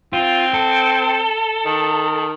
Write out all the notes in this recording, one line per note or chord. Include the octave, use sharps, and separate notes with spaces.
C4 F4
A4
D#3